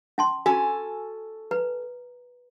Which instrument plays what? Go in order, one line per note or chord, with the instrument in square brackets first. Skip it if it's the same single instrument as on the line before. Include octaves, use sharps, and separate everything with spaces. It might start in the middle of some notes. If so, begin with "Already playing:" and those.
[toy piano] C#4 A5 C6
[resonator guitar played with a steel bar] C#4 A4 G#5 [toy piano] F#4
[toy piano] B4 A#5